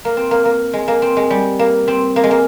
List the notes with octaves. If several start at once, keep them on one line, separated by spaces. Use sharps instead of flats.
A#3
C4
A#3
A#3
G#3
A#3
C4
G#3
G3
A#3
C4
A#3
G#3
A#3